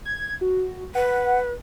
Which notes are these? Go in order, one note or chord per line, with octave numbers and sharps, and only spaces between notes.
G#6
F#4
B4 F#5